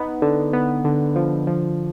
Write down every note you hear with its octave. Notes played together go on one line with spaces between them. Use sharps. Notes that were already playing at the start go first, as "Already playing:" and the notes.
Already playing: B3 D#4
D3
B3
D3
F3
F3